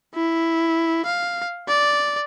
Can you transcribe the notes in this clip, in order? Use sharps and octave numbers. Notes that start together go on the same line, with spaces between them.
E4
F5
D5